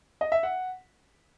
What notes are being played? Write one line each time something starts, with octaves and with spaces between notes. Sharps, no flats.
D#5
E5
F#5